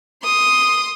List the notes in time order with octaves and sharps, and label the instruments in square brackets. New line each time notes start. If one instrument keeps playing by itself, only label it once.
[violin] C6 D#6